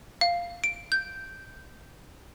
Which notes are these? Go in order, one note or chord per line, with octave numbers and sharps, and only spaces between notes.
F5
D7
G6